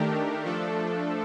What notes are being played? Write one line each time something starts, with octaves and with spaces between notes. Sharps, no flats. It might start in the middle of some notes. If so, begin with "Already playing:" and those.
Already playing: D#3 A3 D4 G4 A#4
F3 A3 D4 A4